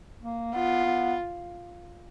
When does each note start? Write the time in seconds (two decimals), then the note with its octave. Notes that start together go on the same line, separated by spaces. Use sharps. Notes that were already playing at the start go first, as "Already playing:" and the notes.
0.23 A#3
0.54 B3 F4
0.86 B3